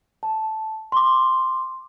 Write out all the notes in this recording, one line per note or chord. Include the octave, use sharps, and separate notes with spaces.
A5
C6 D6